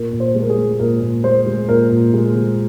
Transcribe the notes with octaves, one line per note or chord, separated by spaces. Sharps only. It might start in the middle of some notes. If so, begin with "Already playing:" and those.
Already playing: A#2 A#4
A#2
C5
G#3
A#4
G#4
G#3
A#2 A#4
A#2
G#3 C5
G#3
A#2 A#4
A#2
G#3
G#3